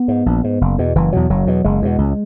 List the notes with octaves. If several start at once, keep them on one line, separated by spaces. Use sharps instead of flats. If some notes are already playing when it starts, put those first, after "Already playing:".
Already playing: B3
G#2
A#1
G#2
F#1
E2 B2
F#1 E3
E2 B2 F#3
F#1 F#3
E2 B2
F#1 G#3
E2 B2
C#2